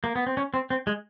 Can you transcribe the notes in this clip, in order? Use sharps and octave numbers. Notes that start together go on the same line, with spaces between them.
A#3
B3
C4
C#4
C4
C4
G#3